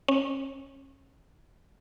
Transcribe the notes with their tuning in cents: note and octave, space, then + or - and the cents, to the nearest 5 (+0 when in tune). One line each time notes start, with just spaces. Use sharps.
C#4 -30